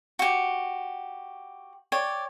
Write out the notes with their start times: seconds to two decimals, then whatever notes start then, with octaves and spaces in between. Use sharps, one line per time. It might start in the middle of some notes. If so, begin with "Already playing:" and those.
0.19 F#4 G4
1.92 C#5 D5 G5